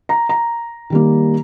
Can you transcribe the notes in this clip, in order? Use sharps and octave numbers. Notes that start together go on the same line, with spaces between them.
A#5
A#5
D#3 G3 A#3